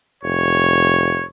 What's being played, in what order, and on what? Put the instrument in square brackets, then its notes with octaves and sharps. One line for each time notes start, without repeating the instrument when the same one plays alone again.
[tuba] F1 [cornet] C#5